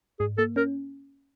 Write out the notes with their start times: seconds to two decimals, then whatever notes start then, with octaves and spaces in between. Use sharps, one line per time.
0.20 G#2 G#4
0.38 A#3 A4
0.56 C#4 A#4